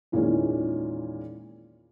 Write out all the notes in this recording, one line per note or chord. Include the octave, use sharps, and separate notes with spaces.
E2 A#2 D#3 E3 G#3 C#4